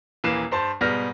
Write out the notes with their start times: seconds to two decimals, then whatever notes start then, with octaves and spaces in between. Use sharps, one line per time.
0.24 D#1 E3 A#3 B4 C7 E7
0.51 G2 C5 A5
0.81 G#2 B2 G3 B3 F6 A#6